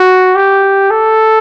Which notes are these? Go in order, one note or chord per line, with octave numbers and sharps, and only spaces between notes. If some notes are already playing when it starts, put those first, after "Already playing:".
Already playing: F#4
G4
A4